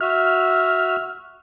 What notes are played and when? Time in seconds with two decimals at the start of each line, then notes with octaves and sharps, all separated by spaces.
0.01 F#4 E5 F6